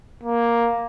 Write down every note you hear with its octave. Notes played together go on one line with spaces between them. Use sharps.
A#3